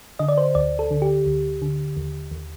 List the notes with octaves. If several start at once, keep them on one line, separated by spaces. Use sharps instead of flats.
D3 D#5
D5
C5
D2 D5
A4
D3
G4
D2
D3
D#2
D#2